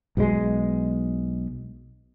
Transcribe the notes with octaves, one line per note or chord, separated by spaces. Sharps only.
B1 B2 F#3 G#3